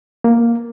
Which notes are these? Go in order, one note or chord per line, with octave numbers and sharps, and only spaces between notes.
A#3